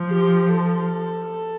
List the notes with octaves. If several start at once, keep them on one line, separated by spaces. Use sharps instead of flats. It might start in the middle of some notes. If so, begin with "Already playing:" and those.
Already playing: F3
G4
A4